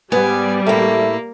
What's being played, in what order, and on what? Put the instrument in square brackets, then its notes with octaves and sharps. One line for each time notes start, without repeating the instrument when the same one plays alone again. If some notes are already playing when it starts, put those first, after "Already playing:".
[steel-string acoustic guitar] G#2 B3 [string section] G3 [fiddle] G#5
[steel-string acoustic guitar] A2 E4 [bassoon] A3 [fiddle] A#3